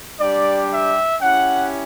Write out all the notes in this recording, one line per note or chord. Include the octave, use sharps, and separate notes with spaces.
G3 D4 G4 D5
E5
C#4 E4 G4 F#5